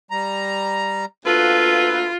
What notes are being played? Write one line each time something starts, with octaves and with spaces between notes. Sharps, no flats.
G3 A#5
D2 A#3 F4 A4 B4